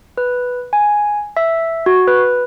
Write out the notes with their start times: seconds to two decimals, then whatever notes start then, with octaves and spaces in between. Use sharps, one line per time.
0.18 B4
0.73 G#5
1.37 E5
1.86 F#4
2.08 B4